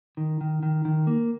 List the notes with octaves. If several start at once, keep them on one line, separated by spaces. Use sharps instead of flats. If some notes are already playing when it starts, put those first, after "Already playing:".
D#3
D#3
D#3
D#3
A#3